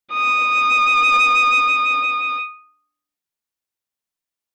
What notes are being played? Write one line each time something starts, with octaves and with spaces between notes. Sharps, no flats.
D#6